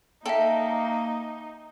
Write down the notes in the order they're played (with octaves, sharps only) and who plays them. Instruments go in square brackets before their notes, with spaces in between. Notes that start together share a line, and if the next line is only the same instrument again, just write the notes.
[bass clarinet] A#3 [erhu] D#4 [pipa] A4 [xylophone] E5 G5